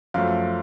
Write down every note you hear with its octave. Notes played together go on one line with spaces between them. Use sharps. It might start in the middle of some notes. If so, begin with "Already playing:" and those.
F#2 F3 A3 F5